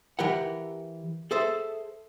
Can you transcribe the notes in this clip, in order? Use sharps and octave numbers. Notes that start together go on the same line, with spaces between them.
E3 G4 A#4 F#5
G#4 A4 C5 E5